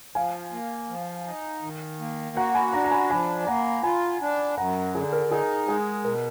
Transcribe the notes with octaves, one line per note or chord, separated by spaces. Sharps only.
F3 F5 G#5
A#3
F3
D#4
D#3
A#3
F#4 F#5 A#5
G#5 B5
D4 F#5 A#5
A#5
G#5 B5
F3 G#5 B5
A#3 F#5 A#5
F4 G#5 B5
D4
F#2 F#5 A#5
D3 G#4
A#4
D#4 G#4
G#3 G#4
B2 A#4